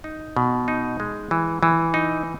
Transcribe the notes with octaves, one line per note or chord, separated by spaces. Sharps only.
D#4
B2
D#4
G#3
E3
E3
D#4